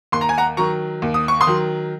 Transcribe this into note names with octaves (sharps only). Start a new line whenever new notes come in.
D#2 C6
A#5
G#5
F#5 A#5
D#3 F#3 A#5 C#6
D#2
D#6
C#6
C6 D#6
D#3 F#3